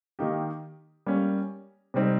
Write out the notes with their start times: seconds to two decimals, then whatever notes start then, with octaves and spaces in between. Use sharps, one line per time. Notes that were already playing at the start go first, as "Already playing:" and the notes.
0.19 D#3 A#3 D#4 G4
1.07 G3 A#3 C#4
1.94 C3 G3 C4 D#4